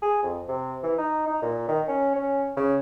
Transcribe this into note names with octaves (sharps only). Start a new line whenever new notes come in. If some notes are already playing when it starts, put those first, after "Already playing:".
G#4
F2
C3
E3
D#4
D#4
A#2
D#3
C#4
C#4
C#3